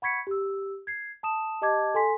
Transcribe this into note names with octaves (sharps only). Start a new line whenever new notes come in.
F#5 B5 C#6 G#6 B6 C#7
G4 E6
G#6 C7
A5 D#6 E7
G4 D#5 A5 D6 G#6
A4 G#5 C6 B6